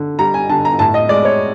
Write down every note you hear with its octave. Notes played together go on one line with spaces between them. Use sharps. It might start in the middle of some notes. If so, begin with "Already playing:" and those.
Already playing: D3
G3 A#5
G#5
D3 A5
A#5
A2 A5
D#5
G#3 D5
C#5